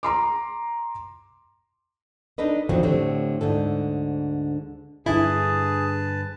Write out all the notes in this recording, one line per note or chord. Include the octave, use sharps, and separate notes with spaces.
A#5 C6 D6
D4 D#4 A4 B4 D#5
F2 D3 D#3 F3 F#3 C4
A2 D3 A3 C4 G4
D2 G#2 D3 A4
G2 D3 E4 G#4 B4 A5